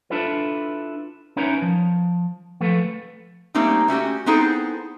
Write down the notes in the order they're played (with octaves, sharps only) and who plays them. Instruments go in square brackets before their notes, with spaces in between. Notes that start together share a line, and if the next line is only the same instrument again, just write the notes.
[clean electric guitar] D4 E4 F4 A4 B4
C#4 D#4 E4 A#4 B4 C#5
F3
F3 A3 A4 B4
[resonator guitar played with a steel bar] G3 A3 A#3 C4 C#4 D#4
A3 C#4 F#4 G4
B3 C4 D#4 E4 G#4 A4